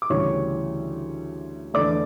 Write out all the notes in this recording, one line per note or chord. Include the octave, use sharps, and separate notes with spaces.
D6
D2 C#3 E3 G3 C#5 C#6
E2 D3 A3 D5 D6